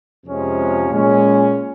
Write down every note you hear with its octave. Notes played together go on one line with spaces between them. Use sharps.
F2 C3 F3 G#3 C#4
A#2 G#3 C#4